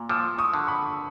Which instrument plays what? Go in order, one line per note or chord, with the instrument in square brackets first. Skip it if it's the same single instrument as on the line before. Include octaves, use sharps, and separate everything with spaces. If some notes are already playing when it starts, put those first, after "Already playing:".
Already playing: [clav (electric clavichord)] A#2
[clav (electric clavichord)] F3 [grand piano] D6 E6
[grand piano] C#6 D#6
[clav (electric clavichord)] D3
[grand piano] B5 C#6